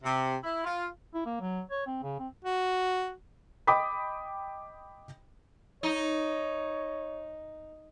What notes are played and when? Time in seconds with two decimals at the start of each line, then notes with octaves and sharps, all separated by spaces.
0.03 C3
0.44 E4
0.64 F4
1.14 E4
1.26 A#3
1.41 F#3
1.71 C#5
1.87 C4
2.03 C#3
2.20 C4
2.45 F#4
3.67 D#5 G5 B5 D6 D#6 B6
5.83 D#4 C#5